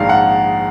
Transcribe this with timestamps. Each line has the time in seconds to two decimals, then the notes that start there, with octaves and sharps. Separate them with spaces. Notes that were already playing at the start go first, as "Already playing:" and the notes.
Already playing: A#1 G#2 D#3 F5
0.09 F#5